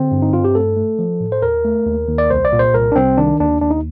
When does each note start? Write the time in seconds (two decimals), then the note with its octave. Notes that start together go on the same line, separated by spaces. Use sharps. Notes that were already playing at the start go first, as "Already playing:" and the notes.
Already playing: D3 C4
0.12 G2
0.22 D#4
0.33 G2 F4
0.44 G4
0.55 A3 A4
0.77 A3
0.99 F3
1.20 A2
1.32 C5
1.42 D#2 A#4
1.64 A3
1.86 D#2
2.08 D#2
2.18 D5
2.30 C2 C5
2.45 D5
2.53 A#2
2.59 C5
2.74 C2 A#4
2.92 D4
2.96 C2 C4
3.18 D#3 D4
3.40 D#2 D4
3.61 D#2 D4
3.71 D#4